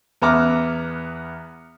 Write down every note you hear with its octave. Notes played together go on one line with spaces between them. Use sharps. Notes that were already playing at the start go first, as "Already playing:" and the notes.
E2 B3 E5 A#5 D6 F6